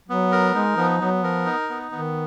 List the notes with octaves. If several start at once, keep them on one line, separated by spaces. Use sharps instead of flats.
F#3 B3
A#4
G#3 D#4
F3 B3
F#3 B3
F3 A#4
D#4
B3
D#3 B3